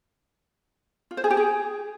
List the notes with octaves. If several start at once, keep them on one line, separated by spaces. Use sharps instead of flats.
F4
C5
G#4
G4
G#4